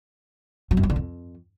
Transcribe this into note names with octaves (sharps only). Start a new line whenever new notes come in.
F#3
F#2
F#3
D3
F2